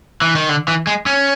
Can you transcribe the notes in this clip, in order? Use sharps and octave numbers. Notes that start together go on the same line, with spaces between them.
E3
D#3
D3
E3
G#3
C#4